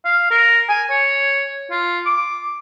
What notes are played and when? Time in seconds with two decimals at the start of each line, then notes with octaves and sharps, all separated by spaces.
0.05 F5
0.31 A#4
0.69 G#5
0.90 C#5
1.71 F4
2.06 D6